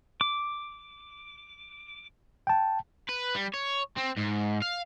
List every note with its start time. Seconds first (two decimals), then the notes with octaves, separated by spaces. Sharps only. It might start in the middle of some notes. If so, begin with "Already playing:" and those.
0.21 D6
2.47 G5 A5
3.09 B4
3.35 G3
3.54 C#5
3.97 C4
4.17 G#2
4.62 F5